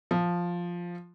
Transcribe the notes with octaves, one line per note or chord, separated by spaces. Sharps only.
F3